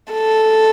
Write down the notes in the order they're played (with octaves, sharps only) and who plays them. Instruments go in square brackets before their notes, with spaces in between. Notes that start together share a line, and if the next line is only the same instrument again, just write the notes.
[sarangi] A4